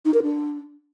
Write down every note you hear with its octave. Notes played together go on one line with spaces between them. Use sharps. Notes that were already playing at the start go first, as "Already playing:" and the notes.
D#4
A#4
D4